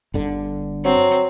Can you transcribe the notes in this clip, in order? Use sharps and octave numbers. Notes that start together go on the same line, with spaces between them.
G1 D3
F#3 C4